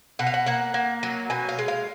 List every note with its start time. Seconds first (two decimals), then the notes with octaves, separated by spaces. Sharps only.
0.19 B2 F#5
0.27 F5
0.34 F#5
0.46 A#3 F#5
0.74 A#3
1.03 F#3
1.30 B2 G#5
1.49 F5
1.59 G#3
1.68 F5